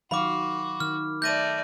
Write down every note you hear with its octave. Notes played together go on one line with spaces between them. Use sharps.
D#3 F#3 F#4 F5 B5 D6
D#3 F6
A3 D5 G6 A#6 D#7